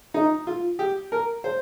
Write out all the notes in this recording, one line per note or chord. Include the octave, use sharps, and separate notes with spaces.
D#4
F4
G4
A#4
C5